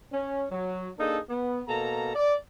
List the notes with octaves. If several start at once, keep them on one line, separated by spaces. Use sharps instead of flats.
C#4
F#3
A#3 D4 D#4 G#4 A4
B3
B2 A#3 A4 A#5
D5